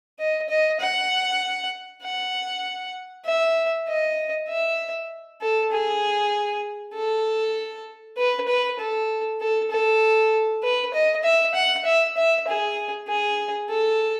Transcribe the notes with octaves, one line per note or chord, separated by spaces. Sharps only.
D#5
D#5
F#5
F#5
E5
D#5
E5
A4
G#4
A4
B4
B4
A4
A4
A4
B4
D#5
E5
F#5
E5
E5
G#4
G#4
A4